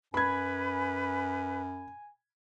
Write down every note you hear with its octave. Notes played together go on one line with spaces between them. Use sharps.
F#2 B4 G#5 B5 G#6